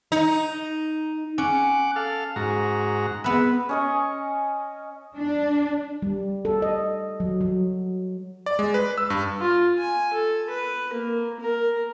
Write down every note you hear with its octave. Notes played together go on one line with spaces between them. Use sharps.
D#4
C#4 F#5 D6
A4 F5
G#2 F#4 A#5
B3 B4 E5
C#4 D#5 C#6
D4
G3
A4
D#5
F#3
F#3
D5
G#3
B4
E6
G2
F4
G#5
A4
B4
A#3
A#4